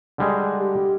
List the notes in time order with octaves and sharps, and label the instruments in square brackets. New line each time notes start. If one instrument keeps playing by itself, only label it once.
[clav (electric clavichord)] D3 G3 G#3
[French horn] G4